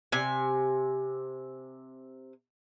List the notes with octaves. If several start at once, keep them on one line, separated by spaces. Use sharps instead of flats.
C3 G#5